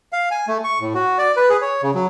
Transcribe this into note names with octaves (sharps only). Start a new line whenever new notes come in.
F5
G#5
A3
C#6
A2
F#4
D5
B4
G#4
C#5
C#3
F#3